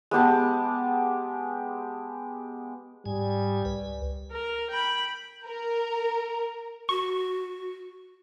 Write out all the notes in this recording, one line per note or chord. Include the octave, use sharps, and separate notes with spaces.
G#3 B3 G4 A5
G#2 G3 G#5
C#2 B4
A#4
G5 B5
A#4
F#4 C#6